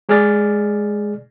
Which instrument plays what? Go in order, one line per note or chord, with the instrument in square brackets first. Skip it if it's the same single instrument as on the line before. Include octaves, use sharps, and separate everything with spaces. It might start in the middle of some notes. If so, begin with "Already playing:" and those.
[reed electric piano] G#3 G#4 D5 F6 A6